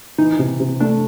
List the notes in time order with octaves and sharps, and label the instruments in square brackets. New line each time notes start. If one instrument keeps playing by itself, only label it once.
[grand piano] E3 [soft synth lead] D#4
[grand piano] C3
C3
[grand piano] A3 [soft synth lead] D4